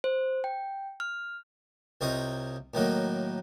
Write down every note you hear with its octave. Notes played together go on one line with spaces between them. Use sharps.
C5
G5
F6
C2 C4 F4 C#5 D#5 A#5
A2 D#3 F#3 A#3